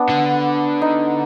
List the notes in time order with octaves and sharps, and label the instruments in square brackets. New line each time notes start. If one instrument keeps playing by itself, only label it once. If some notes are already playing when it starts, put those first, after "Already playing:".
Already playing: [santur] B3 D4
[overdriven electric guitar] D3
[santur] D#4